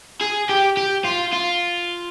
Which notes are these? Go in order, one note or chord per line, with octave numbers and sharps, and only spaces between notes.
G#4
G4
G4
F4
F4